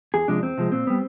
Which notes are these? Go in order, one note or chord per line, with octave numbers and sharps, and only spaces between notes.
E2 G#4
C3 F3 G#3 D4
E2 C4
C3 F3 G#3
A#2 C4
G3 B3